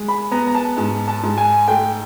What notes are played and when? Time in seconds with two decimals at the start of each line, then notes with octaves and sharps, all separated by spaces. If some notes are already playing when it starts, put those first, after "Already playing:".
Already playing: G#3
0.08 B5
0.31 B3 A#5
0.47 A#5
0.55 A5
0.77 G#2 A5
1.08 A5
1.23 G#2
1.38 G#5
1.68 A3 G5